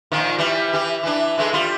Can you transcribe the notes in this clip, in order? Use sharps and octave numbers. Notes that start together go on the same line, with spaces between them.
A#2 D#3 F3
E3 G3
E3 G4
E3 D4
E3 G#3 A3
G3 F4